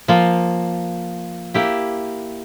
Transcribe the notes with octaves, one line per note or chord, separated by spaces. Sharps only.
F3 A#3 F4
A#3 E4 G4